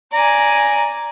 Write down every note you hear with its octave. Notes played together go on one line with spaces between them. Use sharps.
D5 G#5 A#5